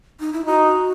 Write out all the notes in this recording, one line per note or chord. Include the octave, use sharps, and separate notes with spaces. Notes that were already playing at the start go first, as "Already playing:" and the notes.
D#4
E4
D#4 F#4